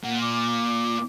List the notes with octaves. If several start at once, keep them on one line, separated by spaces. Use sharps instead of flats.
A#2 F#5
D6